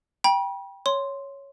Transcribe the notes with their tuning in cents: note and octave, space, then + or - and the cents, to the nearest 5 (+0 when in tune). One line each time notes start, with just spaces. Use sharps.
G5 +5 B5 -40
C#5 +0 C6 +0